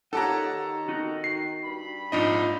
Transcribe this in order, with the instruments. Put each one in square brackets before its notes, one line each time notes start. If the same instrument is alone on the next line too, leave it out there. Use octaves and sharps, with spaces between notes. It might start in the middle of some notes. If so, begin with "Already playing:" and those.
[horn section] A#2 F#5 [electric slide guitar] D#4 G4 C#5 [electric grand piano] A4 A5 A#5
[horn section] D#3
[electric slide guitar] D#4 F#4
[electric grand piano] C7
[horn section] G2 B5
[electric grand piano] A#1 D#4 D#5 [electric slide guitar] G#2 D4 F4